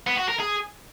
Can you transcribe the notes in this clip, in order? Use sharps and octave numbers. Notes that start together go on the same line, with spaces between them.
B3
F#4
A#4
G#4